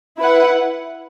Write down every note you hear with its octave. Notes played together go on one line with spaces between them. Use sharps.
E4 B4 F#5